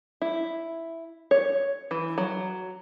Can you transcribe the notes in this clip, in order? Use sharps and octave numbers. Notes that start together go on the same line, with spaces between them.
E4
C#5
E3
F#3